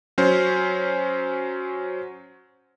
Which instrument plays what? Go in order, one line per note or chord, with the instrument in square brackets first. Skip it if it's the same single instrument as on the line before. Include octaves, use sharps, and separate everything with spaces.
[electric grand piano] F#3 C#4 C5